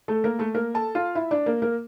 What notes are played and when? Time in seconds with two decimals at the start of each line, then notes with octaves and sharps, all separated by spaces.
0.08 A3 A4
0.24 A#3 A#4
0.39 A3 A4
0.54 A#3 A#4
0.74 A4 A5
0.95 F4 F5
1.15 E4 E5
1.31 D4 D5
1.46 A#3 A#4
1.62 A#3 A#4